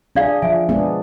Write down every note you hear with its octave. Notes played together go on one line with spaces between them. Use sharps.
D4 G#4 D5 F5
F3 E5 G#5
G#3 B3 D4 G#4